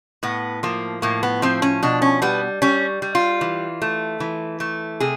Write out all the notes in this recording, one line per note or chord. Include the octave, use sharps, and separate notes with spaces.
A2 B3
F3 A#3
A2 A#3
B3
F3 C4
C#4
B2 D4
C#4
G3 B3
G3 C#4
G3
F4
E3
A3
E3
A3
C3 G#4